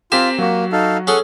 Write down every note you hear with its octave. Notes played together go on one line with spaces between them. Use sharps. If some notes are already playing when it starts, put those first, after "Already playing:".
C4 F4 G4 A#4 G#5 B6 E7
F#3 A#3 F#4
D#4 A4 F5
C#4 G#4 A4 F#5